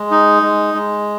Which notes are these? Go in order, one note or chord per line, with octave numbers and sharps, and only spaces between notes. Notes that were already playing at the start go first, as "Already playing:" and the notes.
Already playing: G#3
D#4
G#3
G#3